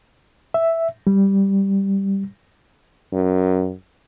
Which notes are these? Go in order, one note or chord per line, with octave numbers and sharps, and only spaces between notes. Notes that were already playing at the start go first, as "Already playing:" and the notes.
E5
G3
F#2